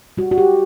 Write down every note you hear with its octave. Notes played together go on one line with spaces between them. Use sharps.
G3 F#4
F#4
G4